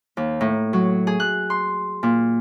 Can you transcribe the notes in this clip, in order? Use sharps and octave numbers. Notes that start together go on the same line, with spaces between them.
D#2
A2
F#3
G#4
F#6
C6
A#2